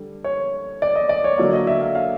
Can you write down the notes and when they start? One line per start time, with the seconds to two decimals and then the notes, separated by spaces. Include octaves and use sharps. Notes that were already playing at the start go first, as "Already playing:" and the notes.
Already playing: D3 G3
0.24 C#5
0.82 D5
0.95 D#5
1.09 D5
1.24 C#5
1.38 D3 F#3 A#3 D5
1.53 D#5
1.67 E5
1.81 F5
1.95 F5